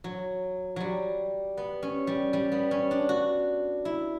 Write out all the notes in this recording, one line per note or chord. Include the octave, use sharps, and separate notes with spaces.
F#3
F#3 G3
B3
C#4
G3
G3
B3
C#4
D4
F#4
E4